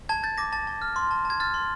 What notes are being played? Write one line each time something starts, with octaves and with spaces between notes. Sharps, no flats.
A5 G#6
G6 A6
D6 A#6
A5 A6
A5
F6
C6
A5
A5
G#6
F6 A6
C6